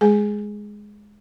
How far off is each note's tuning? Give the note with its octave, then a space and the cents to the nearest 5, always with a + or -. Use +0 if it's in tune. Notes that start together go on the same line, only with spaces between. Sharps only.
G#3 +0 G#4 +0 G#5 +0